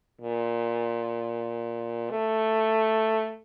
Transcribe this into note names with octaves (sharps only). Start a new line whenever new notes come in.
A#2
A3